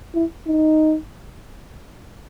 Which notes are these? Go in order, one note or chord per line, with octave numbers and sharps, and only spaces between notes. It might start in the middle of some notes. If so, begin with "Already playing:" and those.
E4
D#4